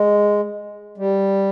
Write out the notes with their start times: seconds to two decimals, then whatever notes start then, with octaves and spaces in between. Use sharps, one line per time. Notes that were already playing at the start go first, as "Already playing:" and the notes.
Already playing: G#3
0.98 G3